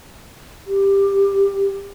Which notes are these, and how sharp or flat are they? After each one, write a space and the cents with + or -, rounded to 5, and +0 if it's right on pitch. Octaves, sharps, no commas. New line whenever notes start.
G4 +10